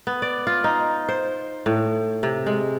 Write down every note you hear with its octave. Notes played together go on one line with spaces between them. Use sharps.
B3
D5
F4
D#4
C5
A2
C3
G#3